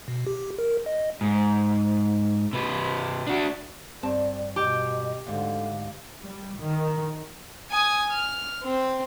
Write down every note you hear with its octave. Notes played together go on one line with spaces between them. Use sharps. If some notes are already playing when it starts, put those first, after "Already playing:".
B2
G4
A#4
D#5
G#2
C3 B4
D4 F#4
G2 C4 D5 A5
B2 G4 D#5
D2 G#2 D3 F5
G3
D#3
G#5 D#6
F6
C4